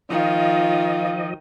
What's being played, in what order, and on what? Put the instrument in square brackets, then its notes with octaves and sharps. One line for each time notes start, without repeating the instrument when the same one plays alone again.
[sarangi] D#3 [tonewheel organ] F3 D#5 [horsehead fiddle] F4